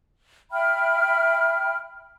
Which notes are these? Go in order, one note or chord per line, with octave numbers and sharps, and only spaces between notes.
E5 G5 B5 F6